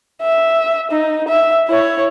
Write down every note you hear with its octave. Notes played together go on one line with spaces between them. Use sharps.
E5
D#4
E5
E4 C#5